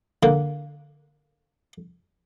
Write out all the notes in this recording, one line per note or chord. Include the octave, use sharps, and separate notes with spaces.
D3 A#3